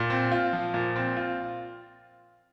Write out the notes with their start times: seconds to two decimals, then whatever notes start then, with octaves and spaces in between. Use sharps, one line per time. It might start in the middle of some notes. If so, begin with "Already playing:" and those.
Already playing: A#2
0.10 C4
0.32 F4
0.53 F3
0.74 A#2
0.96 C4
1.17 F4